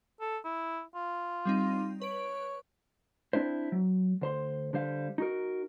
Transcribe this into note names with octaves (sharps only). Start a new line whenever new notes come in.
A4
E4
F4
G3 C4 D#4
B4 C#5 D7
C4 D4 E4 C5
F#3
D2 C5 C6
D3 G3 C5 F5
D#4 F#4 A#4